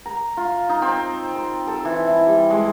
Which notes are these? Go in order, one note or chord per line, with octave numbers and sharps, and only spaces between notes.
A#5
F4
D#4
C4
C6
A4
E3
E4
G3
G#3